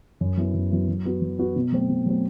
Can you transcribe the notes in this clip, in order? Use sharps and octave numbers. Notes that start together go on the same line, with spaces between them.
F#2
F#3 B3 E4
F#2
F#3 B3 E4
F#3
B3 F#4
F#3
B3 F#4
B2
F#3 A3 C4
B2
F#3 A3 C4